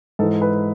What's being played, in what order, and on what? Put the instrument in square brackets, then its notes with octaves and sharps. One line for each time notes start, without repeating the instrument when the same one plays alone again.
[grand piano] G#2 A4
E3
B4